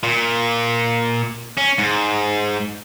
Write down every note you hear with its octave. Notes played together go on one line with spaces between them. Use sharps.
A#2
C#4
G#2